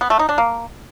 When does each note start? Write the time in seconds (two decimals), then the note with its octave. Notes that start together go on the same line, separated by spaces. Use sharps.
0.01 B3
0.10 A3
0.19 D#4
0.29 D4
0.38 A#3